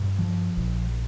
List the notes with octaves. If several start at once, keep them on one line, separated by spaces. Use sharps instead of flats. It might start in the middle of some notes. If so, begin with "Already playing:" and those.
Already playing: G2
F3
A#1